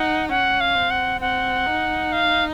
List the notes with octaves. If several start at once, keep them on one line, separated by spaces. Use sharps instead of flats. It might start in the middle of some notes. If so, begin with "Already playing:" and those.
Already playing: D#4 F#5
C#4 F#5
F5
C4
F#5
C4 F#5
D#4
F5